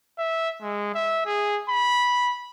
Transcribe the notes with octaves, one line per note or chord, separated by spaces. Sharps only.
E5
G#3
E5
G#4
B5